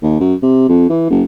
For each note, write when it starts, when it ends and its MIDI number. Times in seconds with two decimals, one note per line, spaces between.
0.02 0.15 39
0.20 0.34 42
0.42 0.66 48
0.69 0.86 41
0.89 1.09 52
1.10 1.23 30